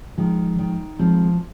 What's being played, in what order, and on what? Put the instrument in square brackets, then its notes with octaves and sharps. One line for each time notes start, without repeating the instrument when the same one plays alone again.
[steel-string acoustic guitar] D#3 [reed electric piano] F3 G#3
[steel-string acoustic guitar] D#3
[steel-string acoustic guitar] F3 [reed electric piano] G#3 C4